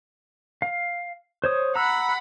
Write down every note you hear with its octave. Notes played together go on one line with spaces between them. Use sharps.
F5
C5 C#5 D#6
F#5 A#5 B5 E6